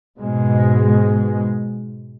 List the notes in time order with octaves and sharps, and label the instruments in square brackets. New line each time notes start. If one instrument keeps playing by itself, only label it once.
[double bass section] G#2 B2 G#3